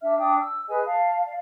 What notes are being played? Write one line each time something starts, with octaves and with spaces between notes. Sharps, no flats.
D4 E5 F6
D4 G5 D#6
E6
G#4 B4 D#5 G#5
F5 A5
D5 F5